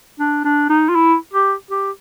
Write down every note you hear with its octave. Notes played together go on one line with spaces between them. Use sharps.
D4
D4
D#4
F4
E4
G4
G4